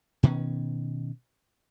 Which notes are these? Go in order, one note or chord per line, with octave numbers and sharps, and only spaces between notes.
B2 D#3 B3 C#4